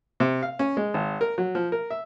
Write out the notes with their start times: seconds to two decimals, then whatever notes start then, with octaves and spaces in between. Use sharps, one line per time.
0.20 C3
0.43 F5
0.59 C#4
0.77 G#3
0.94 G#1
1.21 A#4
1.38 F#3
1.55 F3
1.72 A#4
1.90 E5